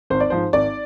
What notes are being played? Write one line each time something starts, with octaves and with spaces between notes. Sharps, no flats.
G#1 C5
D5
G#2 F3 C5
G#1 D5